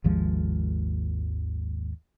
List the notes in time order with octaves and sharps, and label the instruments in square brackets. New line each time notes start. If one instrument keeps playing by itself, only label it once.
[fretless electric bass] G#1 D#2 F3 G#3